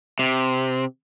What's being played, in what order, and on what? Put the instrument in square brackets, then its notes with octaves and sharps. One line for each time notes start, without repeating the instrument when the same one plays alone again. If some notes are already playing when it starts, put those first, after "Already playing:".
[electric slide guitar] C3